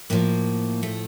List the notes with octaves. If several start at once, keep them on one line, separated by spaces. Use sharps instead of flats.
A2 F3 A#3
A3